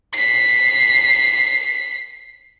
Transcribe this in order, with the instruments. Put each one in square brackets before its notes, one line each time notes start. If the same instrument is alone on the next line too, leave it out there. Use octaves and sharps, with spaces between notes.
[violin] B6 C7